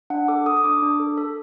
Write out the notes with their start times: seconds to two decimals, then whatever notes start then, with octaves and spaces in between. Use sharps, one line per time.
0.10 D4 F#5
0.28 A4 D6
0.46 A4 D#6
0.57 D#6
0.64 D4 D6
0.82 D4
1.00 A4
1.18 A4